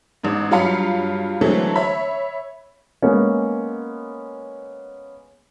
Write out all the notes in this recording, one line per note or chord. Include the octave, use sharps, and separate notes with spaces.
A1 G#2
G2 F#3 F4 F5 B5 C#7
D3 E3 F#3 G#3 A3 C4
C#5 E5 B5
G#3 A#3 B3 C#4